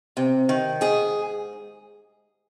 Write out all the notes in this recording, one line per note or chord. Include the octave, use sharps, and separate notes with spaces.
C3
D#3
G#2 G#4